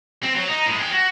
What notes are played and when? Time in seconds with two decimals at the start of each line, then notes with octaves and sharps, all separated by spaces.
0.23 C4
0.35 F#3
0.48 D#4
0.66 A2 G#3
0.79 G#4 G5
0.92 F#4